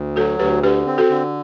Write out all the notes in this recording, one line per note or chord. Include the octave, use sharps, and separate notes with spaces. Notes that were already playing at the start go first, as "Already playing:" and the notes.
Already playing: D2
F#3 F#4 A4
D2 G4 B4
D3 G4 B4
C4
F#4 A4
D3